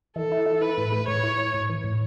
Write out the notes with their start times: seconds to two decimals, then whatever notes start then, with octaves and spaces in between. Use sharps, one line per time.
0.16 E3 A4
0.32 E4
0.46 E4
0.61 E3 B4
0.78 A2
0.92 A3
1.08 A2 C#5
1.23 E4
1.38 E4
1.54 A2
1.69 E3
1.84 A2